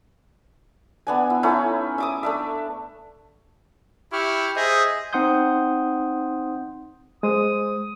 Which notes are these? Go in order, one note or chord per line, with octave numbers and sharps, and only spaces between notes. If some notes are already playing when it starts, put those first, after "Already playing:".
B3 D4 G#5
E4
A3 C#4 D#4 E4
E5 D6 D#6
A3 D4 E5
E4 G4 C#6 F6
G#4 C5 D#5 E5
C4 D#4 F#5 C6 D#6 G6
G#3 C5 D#6